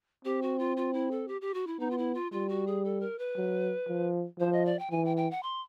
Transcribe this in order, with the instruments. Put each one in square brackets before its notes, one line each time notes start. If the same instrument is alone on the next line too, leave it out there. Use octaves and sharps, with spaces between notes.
[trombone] C4 [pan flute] G4
[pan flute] F#4
F4
F4
E4
A4
G4
G4
F#4
E4
[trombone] B3 [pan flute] D#4
[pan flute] F4
E4
F4
[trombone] G3 [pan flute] F4
[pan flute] F#4
G#4
A4
A#4
B4
[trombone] F#3
F3
[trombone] F3 [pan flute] C5
[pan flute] D#5
D5
G5
[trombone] E3 [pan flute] G#5
[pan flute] G5
G5
F#5
C6